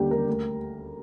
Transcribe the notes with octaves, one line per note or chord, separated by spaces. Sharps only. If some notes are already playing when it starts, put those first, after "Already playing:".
Already playing: D#2 D3 G3 G4
D3 G3 A#4
D2